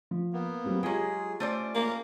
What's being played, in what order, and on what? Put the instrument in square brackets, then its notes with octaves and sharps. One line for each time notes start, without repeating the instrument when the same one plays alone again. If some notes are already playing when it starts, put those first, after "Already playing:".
[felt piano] F3
[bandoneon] A#3 B3
[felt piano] F#3 G3 C4
[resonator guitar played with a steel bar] F#3 G#3 [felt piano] F4 G4 [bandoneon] G#4
[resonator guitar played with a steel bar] A3 C5 D5 [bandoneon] C#4
[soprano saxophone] A#3